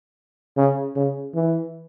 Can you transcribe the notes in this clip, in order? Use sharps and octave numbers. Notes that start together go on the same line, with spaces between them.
C#3
C#3
E3